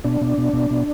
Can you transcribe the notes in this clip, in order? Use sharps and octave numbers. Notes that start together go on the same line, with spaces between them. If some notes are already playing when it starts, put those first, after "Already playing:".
B2 D4
B2
B2
B2
B2